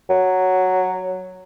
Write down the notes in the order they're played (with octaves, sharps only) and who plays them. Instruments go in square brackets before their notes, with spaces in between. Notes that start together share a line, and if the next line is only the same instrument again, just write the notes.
[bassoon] F#3